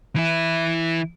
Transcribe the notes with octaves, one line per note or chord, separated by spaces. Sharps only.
E3 E4